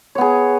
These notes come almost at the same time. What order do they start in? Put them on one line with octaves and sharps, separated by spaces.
C#5 B3 G#4